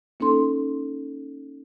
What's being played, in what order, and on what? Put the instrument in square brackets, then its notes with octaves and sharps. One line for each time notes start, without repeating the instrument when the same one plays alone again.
[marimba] A#3 C#4 D#4 A4 C6